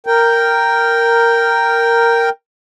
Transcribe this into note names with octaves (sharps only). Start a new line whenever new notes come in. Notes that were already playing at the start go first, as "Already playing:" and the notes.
A#4 G5